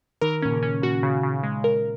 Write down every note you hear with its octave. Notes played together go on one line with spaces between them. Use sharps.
D#3 A#4
A#2 C#4
C#3
C#4
A#2 F#4
C#3
C#3
G#3
A#4